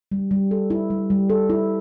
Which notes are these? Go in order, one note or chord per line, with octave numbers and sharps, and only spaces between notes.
G3
G3
A4
E4
G3
G3
A4
E4